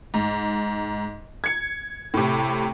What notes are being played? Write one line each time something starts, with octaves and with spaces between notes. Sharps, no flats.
G#2
G#6 C#7
A2 C3